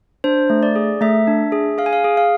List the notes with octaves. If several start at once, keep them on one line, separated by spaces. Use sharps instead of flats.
D4 C5
A3
D5
G#4
A3 E5
D4
G#4
G#4 F5
G#5
F5
G#4
F5